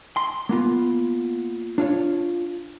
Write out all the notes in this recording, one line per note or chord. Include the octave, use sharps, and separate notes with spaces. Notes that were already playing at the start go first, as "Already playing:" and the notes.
C6
A#3 B3 F4
D4 F4 C#5